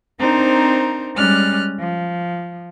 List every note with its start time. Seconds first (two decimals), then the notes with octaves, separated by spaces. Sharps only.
0.19 C4 D4 D#4 A#4 C5
1.16 G3 G#3 C#4 D5 F6 F#6
1.79 F3